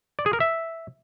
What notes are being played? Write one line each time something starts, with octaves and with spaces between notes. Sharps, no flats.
D5
G#4
A#4
E5